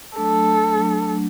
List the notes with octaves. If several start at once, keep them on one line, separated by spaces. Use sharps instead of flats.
F#3 A3 D4 A4
F#3 A3 D4